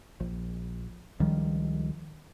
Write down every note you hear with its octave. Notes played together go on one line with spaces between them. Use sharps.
A#1
C#2 D#3 F3 G3